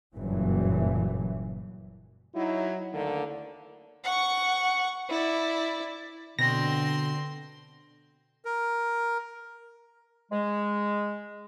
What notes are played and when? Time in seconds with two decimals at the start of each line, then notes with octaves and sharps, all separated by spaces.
0.14 F#1 G2 A#2 E3 F#3
2.35 F#3 D#4 E4
2.93 D2 D3 D#3 A#3
4.04 F#5 C#6
5.09 E4 D5
6.39 B2 D3 C4 C6 A#6
8.45 A#4
10.32 G#3